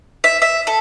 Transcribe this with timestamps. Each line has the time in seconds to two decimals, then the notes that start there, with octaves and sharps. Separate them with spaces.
0.24 E5
0.42 E5
0.67 A4